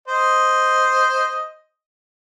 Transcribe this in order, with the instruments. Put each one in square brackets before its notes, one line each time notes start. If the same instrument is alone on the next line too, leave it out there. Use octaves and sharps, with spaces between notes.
[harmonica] C5 D#5